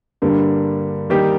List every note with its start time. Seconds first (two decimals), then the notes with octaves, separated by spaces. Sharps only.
0.22 G2 D3 G3 A#3
1.10 D#3 G3 A#3 D#4 G4